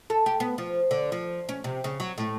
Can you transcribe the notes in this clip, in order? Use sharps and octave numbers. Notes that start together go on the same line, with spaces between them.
A4
G4
B3
F3
D3
F3
C#4
C3
C#3
F#3
A2